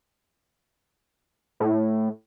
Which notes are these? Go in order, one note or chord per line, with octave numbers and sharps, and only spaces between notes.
A2